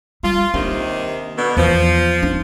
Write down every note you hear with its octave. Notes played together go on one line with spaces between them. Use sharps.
G3 F4
D#2 C3 D#3 D4
B2 D3
E2 F3
D4 D#4